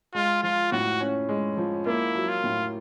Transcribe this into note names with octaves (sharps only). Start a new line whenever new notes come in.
G#3 F4
F3 F4
A2 F#4
C#4
G#3
F3
A#3 E4
F#3
F4
A2